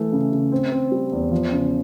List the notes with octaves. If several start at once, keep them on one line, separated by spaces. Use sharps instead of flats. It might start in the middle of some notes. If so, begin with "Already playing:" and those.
Already playing: E3 A3
C#3
C#3
C4
C4
G3
E2
F3
C#3